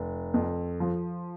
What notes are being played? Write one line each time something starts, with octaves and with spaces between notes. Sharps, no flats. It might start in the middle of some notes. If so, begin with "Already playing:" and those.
Already playing: F1
F2
F3